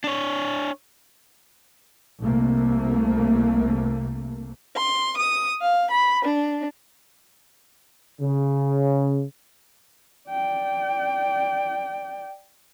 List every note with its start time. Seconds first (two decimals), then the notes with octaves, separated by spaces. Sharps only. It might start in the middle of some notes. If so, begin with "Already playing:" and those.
0.04 D4 C#5
2.21 C2 C3 A3 A#3
4.75 C6
5.17 D#6
5.61 F5
5.90 B5
6.24 D4
8.21 C#3
10.29 D5 G5